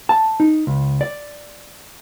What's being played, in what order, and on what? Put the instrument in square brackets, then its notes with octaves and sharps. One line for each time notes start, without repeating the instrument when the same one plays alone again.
[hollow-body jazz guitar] A5
D#4
C#2
D5